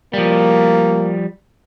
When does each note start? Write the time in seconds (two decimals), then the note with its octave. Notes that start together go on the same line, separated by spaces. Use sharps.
0.13 F3 G3 A#3